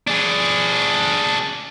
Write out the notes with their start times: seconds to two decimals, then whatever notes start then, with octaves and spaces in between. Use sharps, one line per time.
0.08 D4 G#4